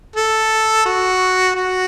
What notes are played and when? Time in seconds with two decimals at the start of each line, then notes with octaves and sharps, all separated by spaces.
0.16 A4
0.86 F#4
1.55 F#4